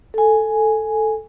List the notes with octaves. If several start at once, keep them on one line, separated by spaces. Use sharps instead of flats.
A4 G#5